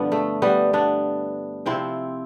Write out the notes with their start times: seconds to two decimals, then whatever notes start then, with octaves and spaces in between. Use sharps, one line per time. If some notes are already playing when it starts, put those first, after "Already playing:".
Already playing: G2 D3 F3 B3 D4
0.12 A3
0.42 G3 B3
0.73 B3 D4
1.66 C3 F3 C4 E4